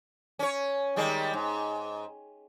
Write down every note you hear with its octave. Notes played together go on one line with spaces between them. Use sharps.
C#4 C#5
D#3 G3 G#3
G#2